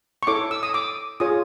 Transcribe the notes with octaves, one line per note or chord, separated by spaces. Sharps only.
C#6
E4 A4 C#5 D6
E6
D#6
D6
F4 G#4 C#5 D#6